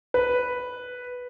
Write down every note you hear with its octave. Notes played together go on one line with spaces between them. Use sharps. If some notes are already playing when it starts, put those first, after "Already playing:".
B4